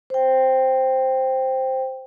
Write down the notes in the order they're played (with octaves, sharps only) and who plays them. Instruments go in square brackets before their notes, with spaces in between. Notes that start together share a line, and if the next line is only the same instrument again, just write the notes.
[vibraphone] C5 G5